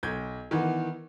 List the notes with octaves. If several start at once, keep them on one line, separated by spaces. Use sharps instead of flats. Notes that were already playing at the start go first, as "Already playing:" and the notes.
B1 G6 G#6
D#3 E3 B3